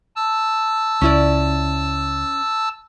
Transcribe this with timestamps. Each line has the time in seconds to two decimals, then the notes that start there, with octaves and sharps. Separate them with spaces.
0.16 A5 E6
1.01 C#2 C#4 E4 D5